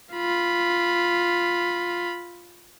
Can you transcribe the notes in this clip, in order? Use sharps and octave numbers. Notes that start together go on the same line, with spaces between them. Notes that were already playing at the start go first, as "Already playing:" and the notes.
F4 B5